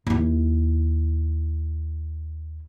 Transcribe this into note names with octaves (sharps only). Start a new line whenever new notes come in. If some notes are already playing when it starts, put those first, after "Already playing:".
D#2 E4